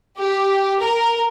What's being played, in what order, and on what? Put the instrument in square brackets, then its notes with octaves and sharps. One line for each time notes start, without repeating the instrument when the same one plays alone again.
[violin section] G4
A#4